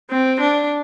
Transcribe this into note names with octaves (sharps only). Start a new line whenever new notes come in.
C4
D4